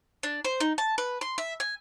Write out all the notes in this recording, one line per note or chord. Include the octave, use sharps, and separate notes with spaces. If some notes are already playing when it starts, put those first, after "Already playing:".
D4
C5
D#4
A5
B4
C6
E5
G#5